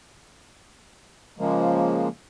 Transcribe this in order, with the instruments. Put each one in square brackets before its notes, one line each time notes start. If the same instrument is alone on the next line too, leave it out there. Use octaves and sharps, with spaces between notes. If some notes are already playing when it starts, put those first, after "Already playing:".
[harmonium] C#3 F3 G#3 A#3